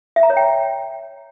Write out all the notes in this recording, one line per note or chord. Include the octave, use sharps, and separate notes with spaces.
E5
A#5
C#5
G5